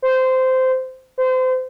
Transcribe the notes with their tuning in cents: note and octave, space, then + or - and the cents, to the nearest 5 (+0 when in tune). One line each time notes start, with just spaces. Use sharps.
C5 -15
C5 -30